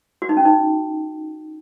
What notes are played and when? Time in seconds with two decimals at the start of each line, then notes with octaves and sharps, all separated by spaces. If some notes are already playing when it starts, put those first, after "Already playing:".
0.22 F#4
0.29 D#4
0.37 C#4
0.45 D#4